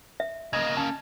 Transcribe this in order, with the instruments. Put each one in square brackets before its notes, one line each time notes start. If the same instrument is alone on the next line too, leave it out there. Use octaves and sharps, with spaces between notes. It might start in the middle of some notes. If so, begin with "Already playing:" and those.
[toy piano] E5
[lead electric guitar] C#3 A#3 [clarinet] D#5 [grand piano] G#6
[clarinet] C#4 [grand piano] A5